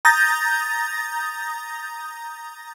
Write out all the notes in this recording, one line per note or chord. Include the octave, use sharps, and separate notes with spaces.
A#5 D#6 G6 A6 A#6